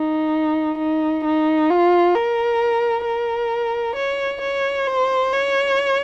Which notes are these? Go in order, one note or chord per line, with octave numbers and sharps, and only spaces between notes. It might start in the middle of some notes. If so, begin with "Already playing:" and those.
Already playing: D#4
D#4
D#4
F4
A#4
A#4
C#5
C#5
C5
C#5